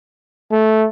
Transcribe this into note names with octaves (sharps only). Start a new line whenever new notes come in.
A3